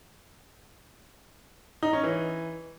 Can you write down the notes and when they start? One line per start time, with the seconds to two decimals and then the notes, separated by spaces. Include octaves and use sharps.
1.83 D#4
1.93 C#4
2.03 E3